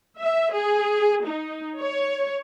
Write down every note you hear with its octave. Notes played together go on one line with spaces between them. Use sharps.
E5
G#4
D#4
C#5